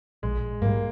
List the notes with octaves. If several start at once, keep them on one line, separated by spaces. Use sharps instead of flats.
A#1 G#3
G#2 G3 A#3